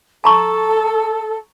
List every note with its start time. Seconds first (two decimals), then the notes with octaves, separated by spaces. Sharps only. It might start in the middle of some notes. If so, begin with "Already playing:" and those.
0.24 A4 A5 A#5 C#6